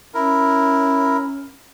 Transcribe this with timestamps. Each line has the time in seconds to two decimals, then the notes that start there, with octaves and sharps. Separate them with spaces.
0.14 C#4 E4 A#4